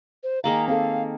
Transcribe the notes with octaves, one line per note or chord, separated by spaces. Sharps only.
C5
D#3 A#3 G#4 F5 A#5 D6
C4 A4 F5